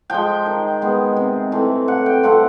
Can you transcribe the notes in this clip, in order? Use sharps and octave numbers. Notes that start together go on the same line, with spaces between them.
F3 G#3 G5
D#3
G#3 B3
C3
E3 A3 C4
A2 F#5
G5
F3 A3 C4 F#5